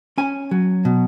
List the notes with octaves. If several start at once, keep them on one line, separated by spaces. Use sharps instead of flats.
C#4 G#5
F#3
B2